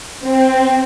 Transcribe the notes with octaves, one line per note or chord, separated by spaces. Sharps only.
C4